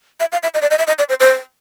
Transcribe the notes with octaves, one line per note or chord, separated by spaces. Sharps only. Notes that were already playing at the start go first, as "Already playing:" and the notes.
E5
F5
E5
D#5
D5
D#5
E5
D#5
D5
C5
C5